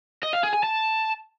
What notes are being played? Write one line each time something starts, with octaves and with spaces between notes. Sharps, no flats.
D#5
F5
G#4
G#5
A5